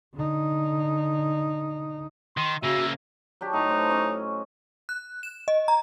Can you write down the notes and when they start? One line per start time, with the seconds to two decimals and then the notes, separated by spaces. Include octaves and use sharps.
0.14 D3 D#4
2.37 D#3 C6
2.63 C#3 A#3 F#4 E5
3.41 F#3 D4 G4
3.53 A2 D#4 G#5
3.69 D4 C5
3.90 C#4 D#5
4.89 F#6
5.23 E7
5.48 D#5
5.68 A#5